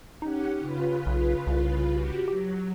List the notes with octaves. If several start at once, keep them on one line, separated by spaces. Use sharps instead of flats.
C#4 D#4 G4 F#5
C#3 F4 B4
B1
C2
F#4 G4
F#3 G4